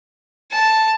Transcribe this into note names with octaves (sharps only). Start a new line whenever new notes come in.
A5